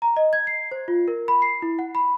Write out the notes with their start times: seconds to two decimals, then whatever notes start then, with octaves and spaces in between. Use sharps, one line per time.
0.02 A#5
0.17 D#5
0.33 G#6
0.47 C7
0.72 C5
0.88 F4
1.08 A#4
1.28 B5
1.42 C7
1.62 E4
1.79 F#5
1.95 B5